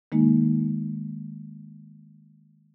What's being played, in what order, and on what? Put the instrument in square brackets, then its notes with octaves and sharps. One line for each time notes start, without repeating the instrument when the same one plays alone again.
[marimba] D#3 G#3 A#3 D#4